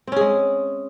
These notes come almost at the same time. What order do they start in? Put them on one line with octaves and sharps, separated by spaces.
C4 C#4 G#4 G#3